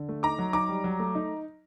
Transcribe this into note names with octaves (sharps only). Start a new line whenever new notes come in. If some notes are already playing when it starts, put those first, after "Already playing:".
Already playing: D3
A3
D#4 A#5 D6
F#3
D#4 A#5 D6
G3
F#3
A3
D#4